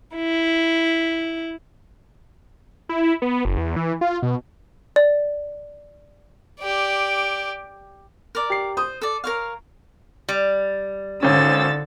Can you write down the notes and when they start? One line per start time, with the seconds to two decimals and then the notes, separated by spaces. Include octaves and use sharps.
0.13 E4
2.89 E4
3.22 B3
3.45 F#1
3.57 E2
3.76 E3
4.01 F4
4.22 B2
4.96 D5
6.60 G4 D5
8.35 A#4 D5
8.50 G4 C7
8.77 C5 D#6
9.01 A4 D5
9.24 A#4 C#5 F5
10.29 G3
11.23 G#1 D3 C#4 E6 A6